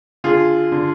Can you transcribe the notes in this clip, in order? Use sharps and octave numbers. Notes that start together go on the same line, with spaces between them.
D3 F4 G#4
D3